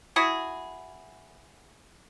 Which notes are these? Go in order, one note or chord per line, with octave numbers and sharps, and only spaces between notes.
E4 F#4 G#4